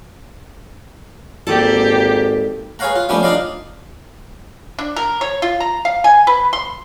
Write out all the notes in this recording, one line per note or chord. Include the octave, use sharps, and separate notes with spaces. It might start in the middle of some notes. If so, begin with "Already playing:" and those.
G#1 A#3 G4 A4 D5 A5
G#4 B4 C#5 F5 F#5 A#5
F4
F3 G3 A3 B3 C#4 G4
D4 D#4 F4 D5 D#5 F5
D4
A#4
C#5
F4
A#5
F5
G#5
B4
C6